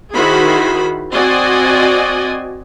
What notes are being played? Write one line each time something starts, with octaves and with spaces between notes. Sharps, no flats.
D#3 E4 F#4 G#4 C5 B5
C4 F#4 D5 D#5 G#5